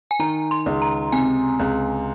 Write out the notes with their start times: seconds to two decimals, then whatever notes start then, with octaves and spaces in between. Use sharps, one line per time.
0.11 G#5
0.19 D#3 A#5
0.51 C6
0.66 C#2
0.82 A#5
1.12 C3 G#5
1.59 C#2